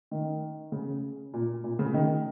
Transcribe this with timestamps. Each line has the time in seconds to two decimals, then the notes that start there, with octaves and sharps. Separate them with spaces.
0.11 D#3
0.72 C#3
1.34 A#2
1.64 A#2
1.79 C#3
1.94 D#3